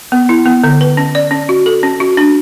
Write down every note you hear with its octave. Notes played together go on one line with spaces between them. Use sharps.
B3
E4
B3
D3
B4
C#4
D5
C#4
F#4
A4
C#4
F#4
D4